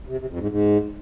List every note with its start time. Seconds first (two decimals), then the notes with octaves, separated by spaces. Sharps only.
0.08 C3
0.18 C3
0.29 F2
0.39 G#2
0.49 G#2